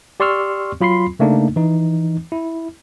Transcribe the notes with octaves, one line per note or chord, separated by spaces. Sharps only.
G4 D5 C6 C#6 E6 F6
F#3 F4 B5 C6 C7
C#3 A3 A#3 D4 D#4
E3 D#4
E4